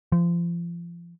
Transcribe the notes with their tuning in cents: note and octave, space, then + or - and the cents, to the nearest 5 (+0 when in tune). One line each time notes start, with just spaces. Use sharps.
F3 -30